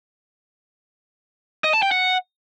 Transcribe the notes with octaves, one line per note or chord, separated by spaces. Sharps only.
D#5
A5
G5
F#5